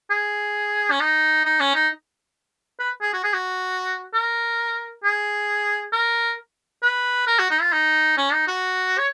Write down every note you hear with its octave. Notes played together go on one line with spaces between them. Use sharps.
G#4
C#4
D#4
D#4
C#4
D#4
B4
G#4
F#4
G#4
F#4
A#4
G#4
A#4
B4
A#4
F#4
D#4
F4
D#4
C#4
D#4
F#4
C#5